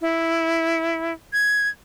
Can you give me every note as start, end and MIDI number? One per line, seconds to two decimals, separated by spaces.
0.01 1.13 64
1.33 1.68 92